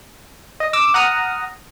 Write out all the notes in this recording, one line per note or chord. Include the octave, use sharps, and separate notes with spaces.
D#5
D6 E6
F#5 A#5 D#6 F6